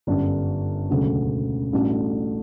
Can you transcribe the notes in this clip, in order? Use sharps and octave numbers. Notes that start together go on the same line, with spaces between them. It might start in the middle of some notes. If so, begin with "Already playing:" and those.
G1 F#2 D3 G3 D4
E1 D2 C#3 F#3 C#4
A1 A2 G3 D4 F#4